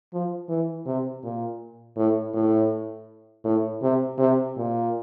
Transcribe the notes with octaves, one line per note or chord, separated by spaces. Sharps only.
F3
E3
C3
A#2
A2
A2
A2
C3
C3
A#2